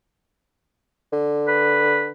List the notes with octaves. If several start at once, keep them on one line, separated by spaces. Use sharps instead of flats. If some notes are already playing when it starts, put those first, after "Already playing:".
D3
B4